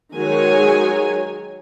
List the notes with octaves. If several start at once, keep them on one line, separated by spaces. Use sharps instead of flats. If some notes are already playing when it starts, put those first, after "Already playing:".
D#3 F#3 G#3 G#4 C#5 G#5